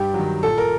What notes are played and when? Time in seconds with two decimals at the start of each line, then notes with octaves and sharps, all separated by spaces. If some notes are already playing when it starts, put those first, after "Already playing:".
Already playing: G2 G4
0.14 D#3 F#3
0.43 A#2 A4
0.58 A#4